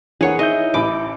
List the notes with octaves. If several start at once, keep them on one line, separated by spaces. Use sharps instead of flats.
E3 D4 G#4 A#4 C#5 F#5
D#4 E4 D#5 E5 D#6 G6 G7
A1 B5 D6 D7